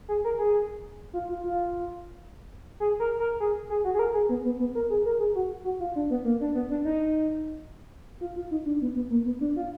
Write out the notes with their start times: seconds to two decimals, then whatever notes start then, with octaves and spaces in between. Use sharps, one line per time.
0.08 G#4
0.24 A#4
0.39 G#4
1.14 F4
1.29 F4
1.44 F4
2.80 G#4
3.00 A#4
3.20 A#4
3.40 G#4
3.70 G#4
3.85 F#4
3.95 G#4
3.99 A#4
4.14 G#4
4.29 B3
4.45 B3
4.60 B3
4.75 A#4
4.90 G#4
5.06 A#4
5.19 G#4
5.35 F#4
5.65 F#4
5.80 F4
5.96 D4
6.10 B3
6.25 A#3
6.41 D4
6.55 B3
6.70 D4
6.85 D#4
8.21 F4
8.36 F4
8.51 D#4
8.66 D4
8.82 B3
8.96 B3
9.10 A#3
9.26 B3
9.41 D4
9.56 F4